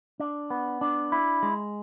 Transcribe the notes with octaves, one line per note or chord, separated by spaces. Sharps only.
D4
B3
D4
E4
G#3